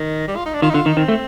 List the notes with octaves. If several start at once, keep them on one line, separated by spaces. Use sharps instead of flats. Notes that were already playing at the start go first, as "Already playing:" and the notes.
Already playing: D#3
G3
F4
D#4
D4
D#3 F4
D#4
D3 F4
D#3 D#4
D#3 C4
A3